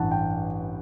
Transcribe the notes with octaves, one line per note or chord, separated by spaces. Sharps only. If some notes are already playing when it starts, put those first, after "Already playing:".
Already playing: A1 G2 E3 F#5 A5
G5